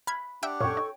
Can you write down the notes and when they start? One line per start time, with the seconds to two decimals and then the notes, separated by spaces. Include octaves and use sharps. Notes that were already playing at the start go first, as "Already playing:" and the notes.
0.07 B5 F6 G#6
0.43 D4 G4 E5 F#5 G5 D7
0.61 F#2 A#2 A4 C#5 G5 C#6
0.77 D#4